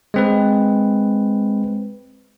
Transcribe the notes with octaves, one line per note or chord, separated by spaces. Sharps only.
G#3 C4 B4